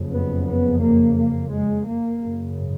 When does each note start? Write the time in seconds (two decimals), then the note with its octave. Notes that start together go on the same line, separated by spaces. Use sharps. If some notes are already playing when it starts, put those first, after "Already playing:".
Already playing: F#1 F2 C#3
0.13 B3
0.47 B3
0.82 A#3
1.17 A#3
1.52 G#3
1.87 A#3
2.21 G#1 F#2 C#3